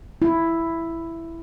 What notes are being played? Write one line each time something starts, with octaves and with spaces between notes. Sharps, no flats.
E4